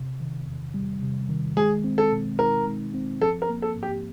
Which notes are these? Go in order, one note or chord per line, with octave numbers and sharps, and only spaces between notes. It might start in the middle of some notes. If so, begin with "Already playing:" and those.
Already playing: C3
D#3
E2
G3
C3
D#3
G#3 G#4
C4
A4
B2
D#4 A#4
G#3
C4
F3 A4
A#4
A#3
A4
G#2
G4